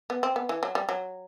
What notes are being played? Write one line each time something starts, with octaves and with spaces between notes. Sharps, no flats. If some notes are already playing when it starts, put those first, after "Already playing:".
B3
C4
B3
E3
F#3
G3
F#3